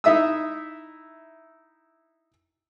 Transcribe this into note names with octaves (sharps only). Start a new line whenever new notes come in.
D#4 E4 E5 D#6 E6